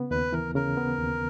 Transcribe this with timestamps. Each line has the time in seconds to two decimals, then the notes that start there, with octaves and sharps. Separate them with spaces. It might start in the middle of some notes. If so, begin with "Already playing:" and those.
Already playing: C#3 B3
0.11 D#2 B4
0.33 E3 A#4
0.55 C#3 A#4
0.77 B3
0.99 D#2